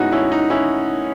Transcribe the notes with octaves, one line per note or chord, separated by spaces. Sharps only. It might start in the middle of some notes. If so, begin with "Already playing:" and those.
Already playing: A2 G#3 B3 C#4 D#4 E4 F#4
C#4 E4
D#4
C#4 E4